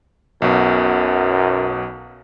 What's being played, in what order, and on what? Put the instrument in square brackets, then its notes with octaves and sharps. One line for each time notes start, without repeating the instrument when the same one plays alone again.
[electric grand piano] B1 B2 [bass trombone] F#2